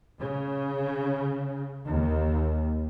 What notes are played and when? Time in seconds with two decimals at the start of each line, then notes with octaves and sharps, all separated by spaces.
0.20 C#3
1.88 D#2